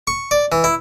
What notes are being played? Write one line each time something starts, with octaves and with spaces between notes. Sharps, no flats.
C#6
D5
E3
E4